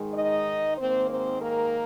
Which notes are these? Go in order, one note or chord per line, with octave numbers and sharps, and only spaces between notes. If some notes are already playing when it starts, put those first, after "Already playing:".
Already playing: G#2 D#3 G#3
D#4 D#5
G#2 D#3 A#3 C4 C5
C4 C5
A#3 A#4